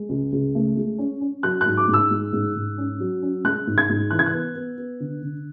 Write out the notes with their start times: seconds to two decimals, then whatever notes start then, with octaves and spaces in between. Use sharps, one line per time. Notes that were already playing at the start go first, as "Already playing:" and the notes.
Already playing: G#3
0.09 C#2
0.32 C#2
0.55 A3
0.77 G#3
0.98 C#4
1.21 C#4
1.43 F#3 F#6
1.61 G#2 F#6
1.77 D6
1.88 G#2
1.93 E6
2.10 G#3
2.33 G#2
2.56 G#2
2.78 C#4
3.00 F#3
3.23 C#4
3.44 G#3 F#6
3.67 G#2
3.78 G#6
3.89 G#2
4.10 E3 F#6
4.19 G#6
4.26 F#6
4.33 B3
4.55 B3
4.78 B3
5.00 D3
5.22 D3